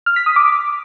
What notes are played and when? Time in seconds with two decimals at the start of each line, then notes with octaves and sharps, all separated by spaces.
0.06 F6
0.16 B6
0.26 D#6
0.36 D6